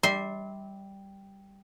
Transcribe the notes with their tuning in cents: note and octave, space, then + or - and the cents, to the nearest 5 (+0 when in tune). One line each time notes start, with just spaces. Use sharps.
G3 +0 E5 -35 C6 +0